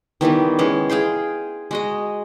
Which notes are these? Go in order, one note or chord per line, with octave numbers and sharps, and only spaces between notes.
D#3 E3 G3 B3
E3 G#3 C#4
G#4 F5 G5 C6
G#3 F#4 D#5